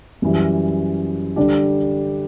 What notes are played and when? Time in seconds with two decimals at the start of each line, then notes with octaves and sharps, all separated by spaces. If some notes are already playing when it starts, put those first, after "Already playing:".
0.22 F#2 E3 G3
1.36 D3 G3 D4 G4